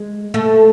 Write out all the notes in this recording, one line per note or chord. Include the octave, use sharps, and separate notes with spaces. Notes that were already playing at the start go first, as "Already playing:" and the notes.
Already playing: G#3
A3